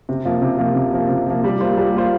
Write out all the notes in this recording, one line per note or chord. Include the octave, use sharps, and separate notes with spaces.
C3
F3 A#3
C3
F3 A#3
C3
F3 A#3
C3
F3 A#3
G3
A#3 F4 C5
G3
A#3 F4 C5